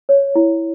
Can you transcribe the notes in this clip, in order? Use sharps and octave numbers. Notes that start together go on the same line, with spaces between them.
C#5
E4